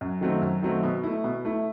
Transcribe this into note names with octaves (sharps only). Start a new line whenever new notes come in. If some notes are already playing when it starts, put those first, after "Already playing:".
F#2
D#3 F#3 A3 C4
F#2
D#3 F#3 A3 C4
B2
A3 E4
B2
A3 E4